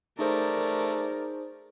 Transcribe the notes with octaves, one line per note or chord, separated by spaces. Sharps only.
A3 D#4 G#4 A#4 C5 D5